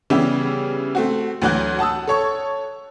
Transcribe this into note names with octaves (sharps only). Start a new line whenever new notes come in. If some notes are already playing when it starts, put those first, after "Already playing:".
C#3 E3 G3 B3 E4 G4
A3 C4 F#4
D2 E3 F#3 F#4 F#6 G6
F#5 A5 D#6 E6
A4 C#5 C#6